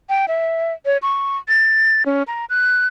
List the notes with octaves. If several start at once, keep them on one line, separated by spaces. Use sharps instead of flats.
G5
E5
C#5
C#6
A6
C#4
A#5
F#6